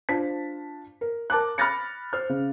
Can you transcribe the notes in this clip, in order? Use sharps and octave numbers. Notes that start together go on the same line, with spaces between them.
D4 F4 C5 A5 B6
A#4
A#4 A5 D6 F#6
B5 F6 F#6 A6 A#6 C#7
C5 F6
C#3